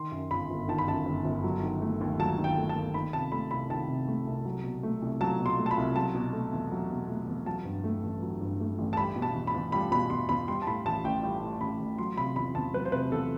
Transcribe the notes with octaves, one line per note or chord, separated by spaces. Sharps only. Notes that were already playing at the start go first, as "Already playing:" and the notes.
Already playing: D#3 C6
F#2
G1 B5
G1
D#3 A5
B5
F#2 A5
G1
G1
F#3
D#3
A3
D#2
F#3 A5
D#3
G5
A3
A5
D#2
D#3 B5
C3 A5
A3 B5
C2 B5
D#3 A5
C3
A3
C2
F#3
B2
A3
C2
F#3 A5
B2
C6
A3
A5
B5
C2
F#3 A5
B2
A3
E2
F#3
B2
A3
E2
F#3 A5
G2
A3
A1
F#3
G2
A3
A1
A5
G3 B5
B2
A5
E2
B5
E2
G3 B5
B2 B5
E2 C6
E2 B5
G3 C6
A5
A2 B5
A1 A5
A1 G5
G3 G5
A2
A1 B5
A1
F#3 C6
C3 B5
E2 B5
E2 A5
F#3 B4
C5
C3 B4
E2 A4